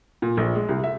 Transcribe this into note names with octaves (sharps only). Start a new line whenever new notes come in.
A#2
A#1
G#3
C2
E5